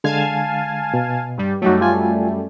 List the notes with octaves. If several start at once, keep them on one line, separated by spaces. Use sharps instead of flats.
D3 G#3 F5 G#5 A5 G#6
B2
G2 G3
F#2 F#3 G3 A3 D#4 F#4
F4 G#5